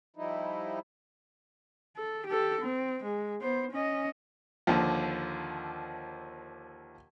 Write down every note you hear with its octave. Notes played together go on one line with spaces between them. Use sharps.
F3 G3 D#4 E4
A4
G4 A4
C4
G#3
B3 C5
C#4 D#5
D#2 D3 F3